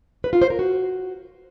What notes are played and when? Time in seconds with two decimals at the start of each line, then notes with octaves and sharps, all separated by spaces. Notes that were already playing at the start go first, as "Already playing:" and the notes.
0.24 B4
0.33 F4
0.42 C5
0.50 A#4
0.59 F#4